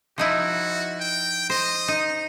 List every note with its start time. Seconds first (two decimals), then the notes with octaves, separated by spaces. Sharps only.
0.18 F3 D#4 E4 F#4
1.00 G5
1.50 C5 D#5
1.88 D#4